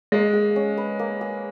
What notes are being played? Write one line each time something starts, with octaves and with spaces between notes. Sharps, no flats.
G#3 A#3
G#4
C#4
B4
A#3
G#4